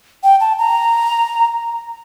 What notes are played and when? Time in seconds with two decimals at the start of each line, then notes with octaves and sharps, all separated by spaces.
0.23 G5
0.40 A5
0.59 A#5